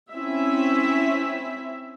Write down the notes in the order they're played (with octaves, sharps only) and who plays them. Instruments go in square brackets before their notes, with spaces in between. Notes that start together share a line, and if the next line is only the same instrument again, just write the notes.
[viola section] C4 C#4 E4 E5